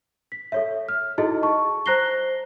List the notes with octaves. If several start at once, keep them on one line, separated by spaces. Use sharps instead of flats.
B6
A4 C#5 E5
F6
D#4 E4 F#4 G#4 A4 D#5
A5 C#6
C5 A#5 F#6 A#6 C7 G7